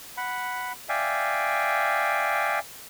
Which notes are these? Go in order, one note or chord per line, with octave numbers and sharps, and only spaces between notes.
F#5 B5
D5 E5 F5 G5 G#5